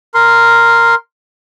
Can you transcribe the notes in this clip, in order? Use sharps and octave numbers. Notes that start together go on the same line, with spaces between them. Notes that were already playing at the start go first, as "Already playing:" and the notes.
A#4 C6